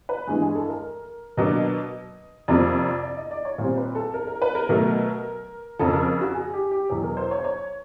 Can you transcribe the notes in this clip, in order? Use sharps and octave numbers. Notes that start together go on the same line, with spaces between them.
B4
G2 E3 G#3 G#4
G#4
A4
A#4
B2 F#3 A#3 D4 D#5
F2 C3 F3 A#3 D5
D5
D#5
D5
C#5
A#2 G3 C4 C5
B4
A4
A#4
A#4
B4
A#4
B2 F#3 A3
F2 C#3 F3 A4
A#4
F#4
G#4
G4
G4
E2 B2 F#3 G#4
A#4
C5
C#5
C5
C#5